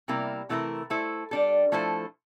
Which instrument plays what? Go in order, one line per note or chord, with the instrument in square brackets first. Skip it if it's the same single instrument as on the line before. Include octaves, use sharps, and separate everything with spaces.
[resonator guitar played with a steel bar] C3 G3 A#3 E4 A#4
C3 E3 A3 E4 A#4
A3 E4 A4 C5
G3 D4 A4
F3 A3 E4 A4 C5